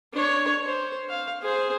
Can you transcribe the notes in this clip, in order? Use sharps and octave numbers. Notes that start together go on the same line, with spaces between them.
D4 C#5
C5
F5
G#4 C5